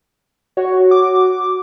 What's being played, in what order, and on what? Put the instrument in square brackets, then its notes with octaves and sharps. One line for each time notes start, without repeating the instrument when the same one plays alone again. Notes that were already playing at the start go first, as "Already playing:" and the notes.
[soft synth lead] F#4 [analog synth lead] C#5
[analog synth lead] D6